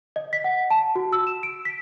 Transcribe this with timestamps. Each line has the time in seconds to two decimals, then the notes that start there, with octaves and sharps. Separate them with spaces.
0.16 D#5
0.33 B6
0.44 F#5
0.70 A5
0.96 F#4
1.13 E6
1.27 E7
1.43 D7
1.65 B6